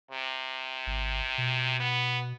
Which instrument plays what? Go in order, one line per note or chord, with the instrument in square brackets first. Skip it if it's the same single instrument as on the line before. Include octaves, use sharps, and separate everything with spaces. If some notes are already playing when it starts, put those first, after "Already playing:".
[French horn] C3
[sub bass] G#1
B2
[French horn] B3